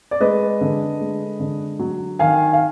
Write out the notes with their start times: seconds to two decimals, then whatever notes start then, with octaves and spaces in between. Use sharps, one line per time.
0.11 D5
0.20 G#3 B4 D#5
0.61 D3
1.00 G#3
1.40 D3
1.79 F#3
2.19 D#3 F5 G#5
2.53 F5